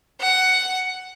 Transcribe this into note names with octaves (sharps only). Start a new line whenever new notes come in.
F#5